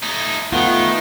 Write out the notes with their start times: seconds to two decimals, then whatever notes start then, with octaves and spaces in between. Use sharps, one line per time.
0.03 A3 D#4
0.53 D#3 A3 B3 F4 F#5